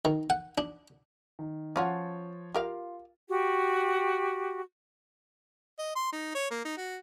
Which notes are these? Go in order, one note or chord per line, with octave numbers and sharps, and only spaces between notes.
D#3
F#5
D4
D#3
F3 C#4 F4 F#4 C#5 A5
F4 G4 A#4 F5
F#4 G4
D#5
C6
D#4
C#5
A#3
D#4
F#4